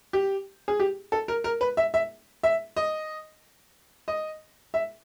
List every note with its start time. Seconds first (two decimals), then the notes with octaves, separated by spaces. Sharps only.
0.13 G4
0.68 G#4
0.80 G4
1.12 A4
1.28 A#4
1.44 A#4
1.61 B4
1.77 E5
1.94 E5
2.43 E5
2.76 D#5
4.08 D#5
4.74 E5